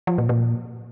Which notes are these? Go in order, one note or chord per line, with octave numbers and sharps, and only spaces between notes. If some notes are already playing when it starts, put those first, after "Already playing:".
F3
A#2
A#2